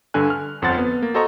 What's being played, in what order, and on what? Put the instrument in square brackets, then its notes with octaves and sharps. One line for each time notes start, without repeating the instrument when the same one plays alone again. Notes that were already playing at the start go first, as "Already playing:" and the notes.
[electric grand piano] G2 D3 A4 G#5 F#6
F6
G1 F2 C4 C5 F#5 A6
B3
A#3
F#4 A4 C5 D#5 A#5 C#6